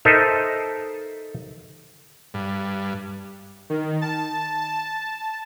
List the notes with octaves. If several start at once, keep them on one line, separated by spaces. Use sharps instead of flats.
D#4 A4 A#4 C5 D#5 E5
G2
D#3
A5
A5